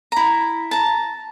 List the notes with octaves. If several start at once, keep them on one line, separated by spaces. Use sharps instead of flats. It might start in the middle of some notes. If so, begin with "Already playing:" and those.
E4 A#5
A5 A#5